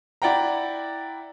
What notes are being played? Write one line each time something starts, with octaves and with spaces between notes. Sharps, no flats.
E4 D5 F#5 G5 A#5